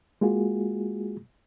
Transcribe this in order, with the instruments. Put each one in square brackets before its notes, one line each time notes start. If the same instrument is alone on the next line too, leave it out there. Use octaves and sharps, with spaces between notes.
[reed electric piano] G#3 A#3 F4 F#4 G#4